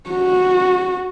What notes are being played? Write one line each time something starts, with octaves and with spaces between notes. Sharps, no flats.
F#4